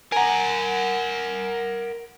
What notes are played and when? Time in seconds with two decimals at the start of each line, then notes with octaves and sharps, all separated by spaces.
0.12 A#4 F#5 G#5 A#5